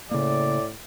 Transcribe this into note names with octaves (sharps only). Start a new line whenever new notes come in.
A2 C#3 A#3 D5